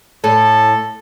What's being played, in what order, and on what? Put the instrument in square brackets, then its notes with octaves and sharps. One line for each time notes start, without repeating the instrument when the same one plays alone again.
[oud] A2 [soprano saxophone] A4